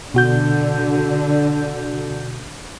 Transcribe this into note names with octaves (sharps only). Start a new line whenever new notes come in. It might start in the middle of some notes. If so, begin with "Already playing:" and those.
B2 D3 F#4 G6